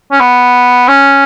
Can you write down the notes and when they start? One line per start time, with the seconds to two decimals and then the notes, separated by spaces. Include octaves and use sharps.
0.12 C#4
0.20 B3
0.88 C#4